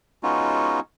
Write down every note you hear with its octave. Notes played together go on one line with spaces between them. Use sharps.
G#3 B3 C#4 D#4 F4 F#4